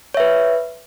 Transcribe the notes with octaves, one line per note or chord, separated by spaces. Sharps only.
B4 C#5 E5